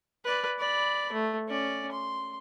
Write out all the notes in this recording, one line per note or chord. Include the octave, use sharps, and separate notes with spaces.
B4 D5
D5 B5
A3
C#4 D5
C6